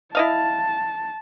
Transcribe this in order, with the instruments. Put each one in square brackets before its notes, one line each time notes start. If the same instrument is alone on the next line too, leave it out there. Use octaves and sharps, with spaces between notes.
[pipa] E4 D#5 F5 [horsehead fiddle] A5